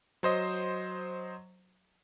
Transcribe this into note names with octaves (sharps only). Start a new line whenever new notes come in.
F#3 C5 D#5